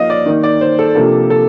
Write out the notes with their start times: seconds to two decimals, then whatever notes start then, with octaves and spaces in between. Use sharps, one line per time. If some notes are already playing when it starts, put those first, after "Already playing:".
Already playing: F3 A#3 D#4 D#5 F5
0.10 D5
0.26 D#3 A#3 D#4
0.43 D5
0.61 C5
0.79 A4
0.95 C3 F3 A#3 D4 A4
1.30 A4